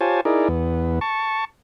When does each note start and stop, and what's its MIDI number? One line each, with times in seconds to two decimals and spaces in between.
0.01 0.21 65
0.01 0.21 67
0.01 0.21 72
0.01 0.21 73
0.01 0.21 80
0.01 0.21 81
0.25 0.48 63
0.25 0.48 64
0.25 0.48 68
0.25 0.48 70
0.25 0.48 74
0.48 0.99 40
0.48 0.99 59
1.01 1.45 81
1.01 1.45 85